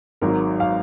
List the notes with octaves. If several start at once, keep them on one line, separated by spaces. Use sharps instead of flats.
G#1 G#2 F#3 A#4
F5